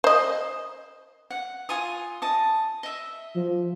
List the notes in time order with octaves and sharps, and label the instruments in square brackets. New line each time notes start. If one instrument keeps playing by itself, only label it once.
[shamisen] C5 D#5
[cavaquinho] F#5
F4 G#5 D#6
D#5 A5 D#6
D#5 E5
[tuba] F3